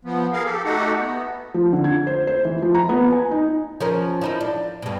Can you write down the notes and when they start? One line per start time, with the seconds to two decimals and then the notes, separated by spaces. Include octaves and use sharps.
0.05 F3 B3
0.33 G#4 A#4 F5
0.45 G4 A4
0.64 A3 D#4 F#4 G4 A4 F#5
0.99 B3
1.54 F3
1.73 D3
1.84 G#6
2.07 C5
2.27 C5
2.45 E3
2.62 F3
2.75 A#5
2.89 B3
3.12 G#5
3.31 D#4
3.80 F3 C#4 A#4
4.21 F3 D#4 E4
4.41 D4
4.82 G2 B2